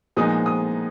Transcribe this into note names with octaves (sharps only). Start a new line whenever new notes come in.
A#2 F3 G#3 B3 D#4 D#6
D#6